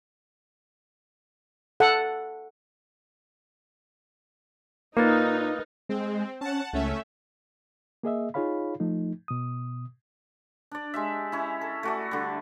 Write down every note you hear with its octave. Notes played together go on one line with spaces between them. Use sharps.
A4 F#5
A#2 A#3 D#4 A#4 B4 A6
G#3 C4
C#4 F#5 A5
C#2 A3 C#4 E5
A#3 G#4 D#5 E5
D#4 F4 G#4 C#5 F5 B5
F3 A3 D#4
B2 D#6
D4 D5
G#3 G4 E5
C#4 E4
A4
A3 F#4 D5
D3 G3